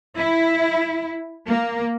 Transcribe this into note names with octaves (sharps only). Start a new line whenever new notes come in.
E4
A#3